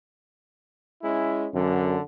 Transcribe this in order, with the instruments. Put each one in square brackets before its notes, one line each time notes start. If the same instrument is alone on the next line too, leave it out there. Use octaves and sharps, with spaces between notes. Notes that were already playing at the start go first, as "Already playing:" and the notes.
[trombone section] G#3 C#4 E4
[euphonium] F#2 [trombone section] D3